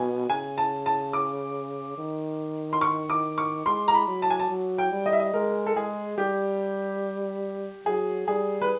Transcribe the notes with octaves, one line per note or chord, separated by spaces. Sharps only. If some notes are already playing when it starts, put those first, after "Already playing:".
Already playing: B2 G#5
C#3 G#5
A5
A5
D6
D#3
C6
C#6
D6
C#6
G#3 C6
A#5
B5
F#3
A5
G#5
A5
F#3
G5
G3
D#5
E5
D#5
G#3 A#4
A4
G#3 G#4
G3 G4
F#3 G#4
G3 G#4
B4